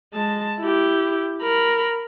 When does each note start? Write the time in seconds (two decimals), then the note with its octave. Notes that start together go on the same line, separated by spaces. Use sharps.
0.13 G#3 A5
0.61 E4 G4
1.42 A#4 B5